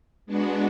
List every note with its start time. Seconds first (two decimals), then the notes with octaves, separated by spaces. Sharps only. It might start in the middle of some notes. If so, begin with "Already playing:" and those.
0.26 G#3 B3 D4 F#4